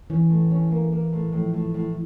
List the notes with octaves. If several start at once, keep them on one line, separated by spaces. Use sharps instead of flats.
E3 C#4
A2
C#4
A#3
A#3
A2
A2 F3
A2
A2